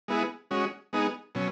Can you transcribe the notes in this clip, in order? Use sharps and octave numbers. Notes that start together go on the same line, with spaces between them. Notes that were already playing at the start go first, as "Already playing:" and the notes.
G#3 B3 E4 G#4
G#3 C#4 F#4
G#3 B3 D#4 G#4
B2 F#3 C#4